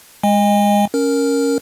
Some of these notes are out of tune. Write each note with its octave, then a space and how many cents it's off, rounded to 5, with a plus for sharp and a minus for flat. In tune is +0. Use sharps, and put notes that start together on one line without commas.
G#3 -15 D#5 +0 G#5 -40
C#4 +0 A#4 +0